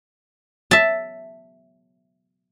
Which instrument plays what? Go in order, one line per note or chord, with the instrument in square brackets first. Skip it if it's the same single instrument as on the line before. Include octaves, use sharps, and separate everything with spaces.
[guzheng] E5 A5